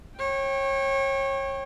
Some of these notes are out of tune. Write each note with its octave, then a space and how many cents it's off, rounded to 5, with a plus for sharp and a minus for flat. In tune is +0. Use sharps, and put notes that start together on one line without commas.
C#5 -30 G5 +0